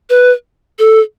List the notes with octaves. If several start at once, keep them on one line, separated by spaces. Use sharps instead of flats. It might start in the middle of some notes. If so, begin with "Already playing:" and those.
B4
A4